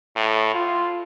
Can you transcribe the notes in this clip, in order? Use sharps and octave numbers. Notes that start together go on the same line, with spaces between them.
A2
F4